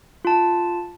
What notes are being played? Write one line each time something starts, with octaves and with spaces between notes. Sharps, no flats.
F4 A5